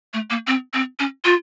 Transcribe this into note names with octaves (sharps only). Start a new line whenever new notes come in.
A3
A#3
C4
C4
C#4
F4